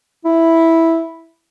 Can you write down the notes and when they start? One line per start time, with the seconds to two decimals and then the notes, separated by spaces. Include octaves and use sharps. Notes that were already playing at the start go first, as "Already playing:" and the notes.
0.25 E4